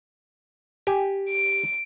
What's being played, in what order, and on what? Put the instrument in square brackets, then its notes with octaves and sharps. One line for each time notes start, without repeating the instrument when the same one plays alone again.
[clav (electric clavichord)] G4 G#5
[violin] D7